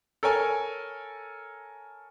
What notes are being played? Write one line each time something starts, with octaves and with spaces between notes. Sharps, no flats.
A4 A#4 C#5 G#5